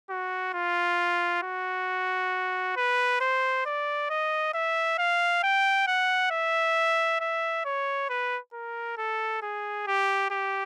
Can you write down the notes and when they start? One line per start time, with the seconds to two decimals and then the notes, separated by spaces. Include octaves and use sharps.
0.10 F#4
0.54 F4
1.43 F#4
2.76 B4
3.21 C5
3.66 D5
4.10 D#5
4.54 E5
4.98 F5
5.43 G5
5.87 F#5
6.31 E5
7.21 E5
7.65 C#5
8.10 B4
8.53 A#4
8.98 A4
9.42 G#4
9.87 G4
10.30 G4